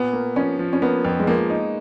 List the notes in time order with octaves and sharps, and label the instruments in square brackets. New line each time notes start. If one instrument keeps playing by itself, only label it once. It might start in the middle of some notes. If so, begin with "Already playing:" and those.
Already playing: [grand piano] A#2 [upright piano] B3
[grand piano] A#3
[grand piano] F3 [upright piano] C#4
[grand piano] F3
[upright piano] C#4
[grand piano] A#3 [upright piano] B3
[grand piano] F2
[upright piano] G#3
[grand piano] F3 [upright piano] A#3
[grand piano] D#4